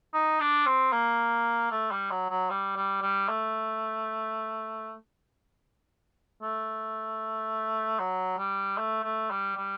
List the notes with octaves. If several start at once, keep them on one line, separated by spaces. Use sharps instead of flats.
D#4
D4
C4
A#3
A3
G3
F#3
F#3
G3
G3
G3
A3
A3
F#3
G3
A3
A3
G3
G3